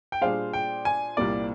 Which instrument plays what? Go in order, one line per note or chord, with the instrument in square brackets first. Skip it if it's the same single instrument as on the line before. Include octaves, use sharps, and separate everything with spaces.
[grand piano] G5
[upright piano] A#2 G3 D4 G#4 C5 [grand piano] F5
[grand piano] G5
G#5
[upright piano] C2 A#2 G3 A#3 F4 [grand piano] D5